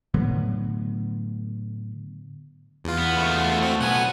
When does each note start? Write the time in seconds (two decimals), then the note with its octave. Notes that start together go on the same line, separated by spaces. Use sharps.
0.14 A2 D3 F#3 B3
2.84 E2 F4
2.98 B3
3.17 A3 F#4
3.62 C4
3.80 B1 B3 F#5 G#5